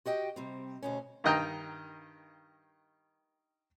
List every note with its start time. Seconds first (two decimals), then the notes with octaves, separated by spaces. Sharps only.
0.06 F#4 G4 D#5 G5
0.36 C3 G3 C4
0.83 D2 B2 C#4
1.24 G2 D#3 D#5 G5 A#5